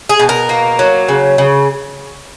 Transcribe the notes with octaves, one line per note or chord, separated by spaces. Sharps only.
G#4
B2
A#4
A#3
F#3
C#3
C#3